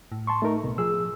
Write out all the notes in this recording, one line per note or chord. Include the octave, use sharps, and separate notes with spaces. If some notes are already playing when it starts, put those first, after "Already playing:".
A2
A5 C6 C#6
A3 D#4 A#4
C2 B2
F3 G#4 E6